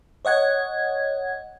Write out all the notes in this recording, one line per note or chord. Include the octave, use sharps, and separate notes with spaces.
C#5 D#5 F#5 G#6